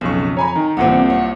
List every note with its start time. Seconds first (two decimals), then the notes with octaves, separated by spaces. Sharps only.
0.01 B1 F2 C#3 C#6
0.37 C#5 G#5 A#5 B5
0.56 D#3
0.77 C2 A#2 D3 E3 C4 F#5
1.10 C#5